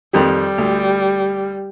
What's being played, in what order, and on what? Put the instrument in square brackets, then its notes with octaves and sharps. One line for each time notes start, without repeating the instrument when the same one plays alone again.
[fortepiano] F2 D#3 G4 [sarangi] G3
[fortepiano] D2